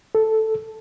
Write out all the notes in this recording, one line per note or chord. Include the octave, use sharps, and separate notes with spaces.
A4